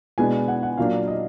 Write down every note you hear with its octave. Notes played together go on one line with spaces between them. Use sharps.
B2 G#3 B3 D4 G#5
F#5
F#5
A#2 F#3 A#3 D4 F5
D#5